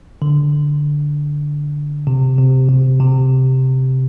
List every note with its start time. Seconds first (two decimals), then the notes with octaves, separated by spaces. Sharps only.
0.22 D3
2.07 C3
2.38 C3
2.69 C3
3.00 C3